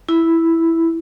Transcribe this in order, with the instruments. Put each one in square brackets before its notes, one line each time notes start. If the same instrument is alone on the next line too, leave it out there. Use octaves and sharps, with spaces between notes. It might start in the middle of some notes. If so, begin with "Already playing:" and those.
[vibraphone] E4